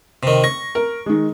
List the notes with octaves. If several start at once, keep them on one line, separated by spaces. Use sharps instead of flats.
C3 D#3
C#6 A#6
A#4
D#3 G#3